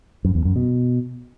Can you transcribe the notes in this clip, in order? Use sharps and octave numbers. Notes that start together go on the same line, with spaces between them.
F#2
E2
F#2
B2